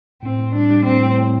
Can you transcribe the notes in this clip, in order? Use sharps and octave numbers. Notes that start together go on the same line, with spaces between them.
A2 C4
A2
G3 D4
G3
A2 C4
A2
A2